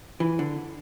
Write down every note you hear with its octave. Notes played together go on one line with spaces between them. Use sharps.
E3
D3